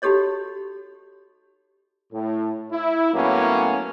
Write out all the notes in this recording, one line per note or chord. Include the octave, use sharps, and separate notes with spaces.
D#4 F#4 G4 A4 C#5 D#5
A2
E4
A2 F#3 A#3 B3 C#4